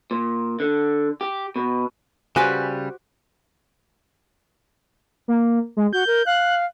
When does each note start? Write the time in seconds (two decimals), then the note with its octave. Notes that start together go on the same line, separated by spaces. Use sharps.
0.11 A#2
0.60 D3
1.21 G4
1.56 B2
2.36 C#3 G3 F#4 G4 B4 C5 G#5
5.28 A#3
5.77 G#3
5.93 F#4 G6
6.07 A#4
6.26 F5 F#6